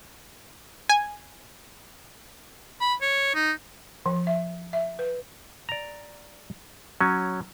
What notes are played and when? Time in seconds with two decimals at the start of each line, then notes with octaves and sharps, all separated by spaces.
0.89 G#5
2.80 B5
3.02 C#5
3.35 D#4
4.06 F3
4.27 E5
4.73 E5
4.99 B4
5.69 D5 A#5
7.01 F#3 C#4